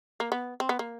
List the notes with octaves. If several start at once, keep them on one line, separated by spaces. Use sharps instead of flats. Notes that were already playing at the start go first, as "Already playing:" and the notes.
A#3
B3
C4
B3
A#3